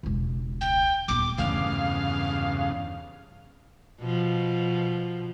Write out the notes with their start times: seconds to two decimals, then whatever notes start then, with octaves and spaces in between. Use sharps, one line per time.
0.03 E1 C#2
0.61 G5
1.08 D#1 B3 D6
1.38 E2 G2 C#3 A3 F5
4.02 B2 F3